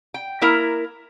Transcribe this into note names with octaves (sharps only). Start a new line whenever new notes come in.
G5
A#3 E4 A#4